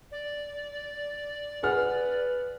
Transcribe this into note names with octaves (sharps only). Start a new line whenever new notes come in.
D5
G#4 B4 F#5 F6